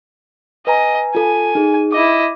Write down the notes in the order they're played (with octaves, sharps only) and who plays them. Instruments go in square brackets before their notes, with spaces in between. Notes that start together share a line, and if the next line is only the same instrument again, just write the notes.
[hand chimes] B4 G#5 A#5 [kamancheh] D#5
[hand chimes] F4 A4 [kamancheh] G#5
[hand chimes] D#4 G#4
[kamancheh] E4 D#5 [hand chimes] D6